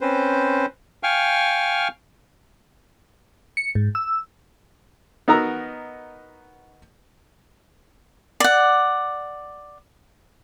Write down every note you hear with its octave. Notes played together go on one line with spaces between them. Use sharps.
C4 C#4 B4 C5
F5 G5 G#5 C#6 F6
C#7
G#2
E6
B3 D#4 F#4 A#4 A#5 E6
D5 F#5